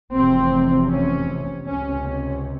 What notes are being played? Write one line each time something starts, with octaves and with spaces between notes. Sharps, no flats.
F1 E2 C3 C4
C#4
C#2 C3 C#4
C#4